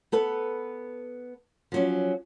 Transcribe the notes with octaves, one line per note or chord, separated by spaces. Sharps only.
B3 A4 B4
F3 F#3 C#4